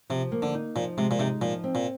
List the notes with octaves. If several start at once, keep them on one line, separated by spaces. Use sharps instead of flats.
C3 F3
A#3
D3
D#4
A#2 F3
C3 G#3
A#2
C3 D#4
A#2 F3
C4
A#2